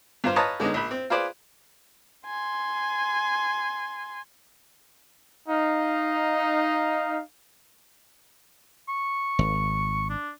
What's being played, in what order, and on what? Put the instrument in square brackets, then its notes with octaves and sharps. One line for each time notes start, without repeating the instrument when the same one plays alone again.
[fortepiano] G2 F4 C5
B4 C#5 D#5 F5 A5 A#5
D3 G#3 B3 C#4 D#4
A#1 B5
C4
F4 G#4 B4 C5 D5
[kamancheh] G#5 C6
[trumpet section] D#4 F5
[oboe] C#6
[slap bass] G#1
[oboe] D4